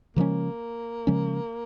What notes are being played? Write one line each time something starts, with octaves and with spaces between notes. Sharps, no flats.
C#3 F3 G#3 A#3 C#4
C#3 F3 G#3 C#4